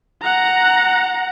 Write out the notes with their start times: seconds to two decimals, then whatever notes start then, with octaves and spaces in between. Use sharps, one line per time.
0.22 F#5 A#5